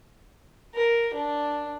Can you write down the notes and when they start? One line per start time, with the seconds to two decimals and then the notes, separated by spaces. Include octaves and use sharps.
0.75 A#4
1.14 D4